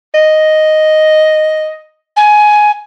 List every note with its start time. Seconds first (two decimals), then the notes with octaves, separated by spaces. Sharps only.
0.14 D#5
2.16 G#5